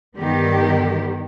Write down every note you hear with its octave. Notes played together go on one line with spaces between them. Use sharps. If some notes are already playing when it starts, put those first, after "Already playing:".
G2 D#3 G3 B3 G4